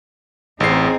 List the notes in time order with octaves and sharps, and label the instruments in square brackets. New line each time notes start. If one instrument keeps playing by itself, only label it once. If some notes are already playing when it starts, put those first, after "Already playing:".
[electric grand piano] A1 C7 [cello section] C4 D#4 G#4